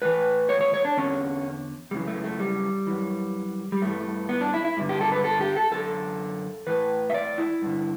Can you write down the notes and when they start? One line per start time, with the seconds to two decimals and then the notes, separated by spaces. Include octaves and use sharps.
0.02 A2 E3 B4
0.49 C#5
0.61 C#5
0.74 C#5
0.85 D4
0.97 E2 D3 C#4
1.91 F#2 C#3 E3 G3
2.07 A3
2.24 A3
2.40 G3
2.87 F#2 E3
3.72 G3
3.82 G2 E3 A3
4.29 B3
4.41 D4
4.54 E4
4.65 E4
4.77 G2 D3
4.89 G4
5.01 A4
5.12 B4
5.24 A4
5.41 G4
5.57 A4
5.72 F#2 D3 A4
6.67 A2 E3 B4
7.10 E5
7.14 D5
7.38 E4
7.62 G2 D3